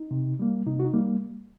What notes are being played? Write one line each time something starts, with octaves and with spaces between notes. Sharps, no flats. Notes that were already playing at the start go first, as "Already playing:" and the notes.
Already playing: D#4
C3
G3 A#3
C3 D#4
F#4
D#4
G3 A#3